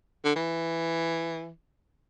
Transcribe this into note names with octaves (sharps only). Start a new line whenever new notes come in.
D3
E3